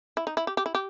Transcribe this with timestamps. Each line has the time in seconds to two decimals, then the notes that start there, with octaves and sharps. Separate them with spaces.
0.17 E4
0.27 D#4
0.37 E4
0.47 G4
0.57 G4
0.66 E4
0.75 G4